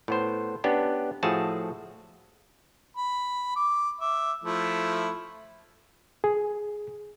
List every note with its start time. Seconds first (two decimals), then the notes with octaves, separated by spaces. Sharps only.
0.08 A2 B3 C5
0.64 B3 C#4 D4 G4
1.23 A2 F3 F#4 G#4 E5 A5
2.97 B5
3.56 D6
4.00 E5 D6
4.44 F3 A3 E4
6.24 G#4